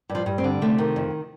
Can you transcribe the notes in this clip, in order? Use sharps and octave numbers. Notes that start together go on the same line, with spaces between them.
G2
F3
G2
C4
D3
C3 A3
D#3
F2